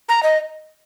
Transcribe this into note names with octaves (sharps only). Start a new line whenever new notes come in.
A#5
D#5